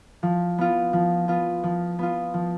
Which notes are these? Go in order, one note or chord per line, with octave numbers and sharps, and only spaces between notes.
F3
B3 F4
F3
B3 F4
F3
B3 F4
F3